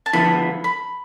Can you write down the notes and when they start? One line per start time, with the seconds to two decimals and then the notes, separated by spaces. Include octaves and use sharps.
0.06 A5
0.13 D3 F3 B3 E4 B5
0.64 B5